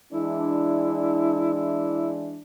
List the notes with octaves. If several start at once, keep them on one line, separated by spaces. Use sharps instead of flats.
E3 G#3 D4 E4
E4